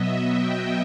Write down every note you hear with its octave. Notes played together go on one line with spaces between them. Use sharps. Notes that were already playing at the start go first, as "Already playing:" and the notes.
Already playing: B2 F#3 B3 D#5 E5
G5